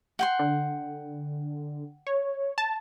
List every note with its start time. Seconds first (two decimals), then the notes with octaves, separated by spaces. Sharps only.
0.19 F#5 G5 C6
0.39 D3
2.07 C#5
2.58 A5